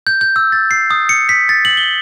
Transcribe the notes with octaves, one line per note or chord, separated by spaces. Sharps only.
G6
G6
E6
A6
C7
D#6
C#7
B6
A6
F#7
G7